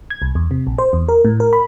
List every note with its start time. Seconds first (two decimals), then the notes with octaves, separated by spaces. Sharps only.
0.10 G#6
0.22 C2
0.35 E2
0.51 C3
0.67 A#1
0.78 C5
0.93 E2
1.09 A#4
1.25 A2
1.40 A#4
1.53 B5